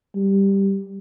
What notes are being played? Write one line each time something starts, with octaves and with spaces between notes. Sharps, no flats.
G3